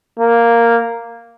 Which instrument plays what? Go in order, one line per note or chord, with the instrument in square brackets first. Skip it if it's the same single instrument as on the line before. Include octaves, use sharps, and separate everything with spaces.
[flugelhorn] A#3